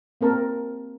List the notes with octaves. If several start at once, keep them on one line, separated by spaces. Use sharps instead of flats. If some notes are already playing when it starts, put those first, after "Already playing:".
A#3 C4 A#4 A5